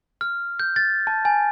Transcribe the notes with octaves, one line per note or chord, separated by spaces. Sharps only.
F6
G6
A6
A5
G#5